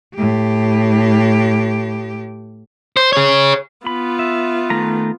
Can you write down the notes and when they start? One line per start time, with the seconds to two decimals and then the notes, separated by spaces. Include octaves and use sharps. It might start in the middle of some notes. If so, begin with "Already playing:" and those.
0.15 A2 G4
2.97 C5
3.13 G#4 C#5
3.87 B3 F4 B5
4.19 E5
4.70 D#3 A3 A#5